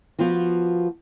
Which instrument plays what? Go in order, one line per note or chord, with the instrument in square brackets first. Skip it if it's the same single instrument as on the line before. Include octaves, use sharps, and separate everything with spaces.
[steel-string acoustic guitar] F3 B3 F4 F#4